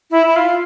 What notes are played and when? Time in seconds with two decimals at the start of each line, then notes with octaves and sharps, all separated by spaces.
0.11 E4
0.27 E4
0.36 F4